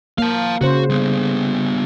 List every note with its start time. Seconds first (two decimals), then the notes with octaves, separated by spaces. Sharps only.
0.18 A#3 F5 A5
0.61 C#3 F#4 C5
0.90 G3 B3